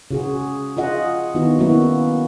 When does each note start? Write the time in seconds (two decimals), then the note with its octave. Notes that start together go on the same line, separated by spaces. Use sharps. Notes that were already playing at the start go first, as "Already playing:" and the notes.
0.11 C#3 F#4 G#4
0.77 F4 G#4 D#5 F#5
1.35 D#3 B3 D#4 E4 F#4
1.59 F#3 A#3 B3 C#4 E4 F#4